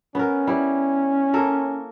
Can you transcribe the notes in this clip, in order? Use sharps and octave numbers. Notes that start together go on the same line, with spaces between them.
B3 C#4 A#4
G3 E4
A#3 A4 A#4